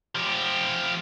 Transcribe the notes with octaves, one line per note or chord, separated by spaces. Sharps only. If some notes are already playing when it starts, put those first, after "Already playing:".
F3 G4